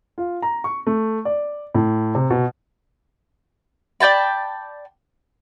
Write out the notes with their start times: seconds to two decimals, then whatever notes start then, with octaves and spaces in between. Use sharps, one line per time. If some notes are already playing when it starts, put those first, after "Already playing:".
0.18 F4
0.42 A#5
0.64 C#6
0.87 A3
1.25 D5
1.74 A2
2.15 C3
2.30 B2
4.00 D5 G5 A5 B5